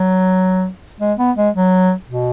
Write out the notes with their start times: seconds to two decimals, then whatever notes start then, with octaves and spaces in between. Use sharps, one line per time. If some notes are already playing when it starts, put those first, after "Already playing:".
Already playing: F#3
1.00 G#3
1.18 B3
1.37 G#3
1.55 F#3
2.09 B2